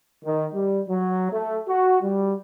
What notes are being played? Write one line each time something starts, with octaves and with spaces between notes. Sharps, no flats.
D#3
G3
F#3
A3
F#4
G3